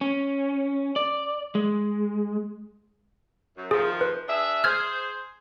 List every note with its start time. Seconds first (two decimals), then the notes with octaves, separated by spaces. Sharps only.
0.01 C#4
0.96 D5
1.55 G#3
3.56 F#2
3.71 C3 D#3 F3 G#4
4.01 B4
4.27 D4 G#4 E5
4.64 G#4 C5 F6 G#6